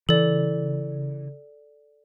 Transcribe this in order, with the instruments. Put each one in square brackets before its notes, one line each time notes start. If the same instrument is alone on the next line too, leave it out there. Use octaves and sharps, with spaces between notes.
[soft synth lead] C#3 [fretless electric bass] E3 [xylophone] A4 D5